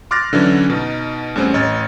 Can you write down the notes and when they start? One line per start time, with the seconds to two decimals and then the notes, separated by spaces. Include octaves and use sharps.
0.11 C6 D6 F6 F#6 A6 A#6
0.33 D3 E3 F#3 C#4
0.70 B2 D#4
1.36 E2 G3 A3 C4 C#4
1.54 A1 C#5 D#5 F6 A6